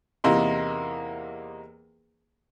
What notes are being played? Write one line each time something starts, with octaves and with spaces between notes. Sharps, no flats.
E2 C3 A#3 D#4 E4 C6